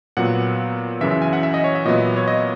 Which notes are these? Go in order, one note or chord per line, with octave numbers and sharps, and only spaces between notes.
A#2 F#3 B3 F#5
F#2 C#3 E3 E5
E5
G#5
F#5
E5
D#5
C#5
E5
A#2 F#3 B3 D#5
C#5
D#5